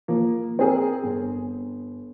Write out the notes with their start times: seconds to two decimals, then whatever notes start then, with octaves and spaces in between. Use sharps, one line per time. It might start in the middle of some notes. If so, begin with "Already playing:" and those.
0.08 F3 A#3
0.59 C4 G#4 A#4
1.03 G1